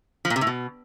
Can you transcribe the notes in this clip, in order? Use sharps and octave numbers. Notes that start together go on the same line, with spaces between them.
F3
A#2
C3
A2
B2